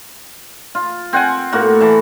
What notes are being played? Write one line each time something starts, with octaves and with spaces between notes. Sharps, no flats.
F4
C4 F#5 G#5
A2 A#3 F#4
E3 A5